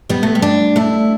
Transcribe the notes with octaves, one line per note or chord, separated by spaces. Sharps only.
G3 B3
A3
G3
D4
A3 E4